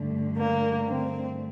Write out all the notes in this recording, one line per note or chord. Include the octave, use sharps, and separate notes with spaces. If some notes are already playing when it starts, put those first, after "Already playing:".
Already playing: G2 D3 A3
A#3
C4